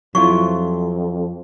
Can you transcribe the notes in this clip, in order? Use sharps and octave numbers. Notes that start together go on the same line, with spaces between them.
F2 F#3 E4 F4 C#6